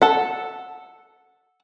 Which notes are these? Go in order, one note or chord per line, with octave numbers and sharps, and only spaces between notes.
A4 F#5